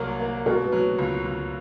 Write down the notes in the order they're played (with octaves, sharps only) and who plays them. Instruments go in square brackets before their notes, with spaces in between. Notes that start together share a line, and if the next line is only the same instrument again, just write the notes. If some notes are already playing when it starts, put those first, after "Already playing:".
Already playing: [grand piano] C2 F#3 A#3
A#3
[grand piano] B2 [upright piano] A#4
[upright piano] B4
[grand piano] F#3
C#2
C#2